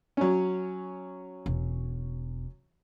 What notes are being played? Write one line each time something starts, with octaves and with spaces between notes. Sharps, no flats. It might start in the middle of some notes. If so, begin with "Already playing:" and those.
F#3 C#4
E1